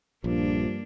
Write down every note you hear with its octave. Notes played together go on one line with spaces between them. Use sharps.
A#1 G2 F3 A#3 D4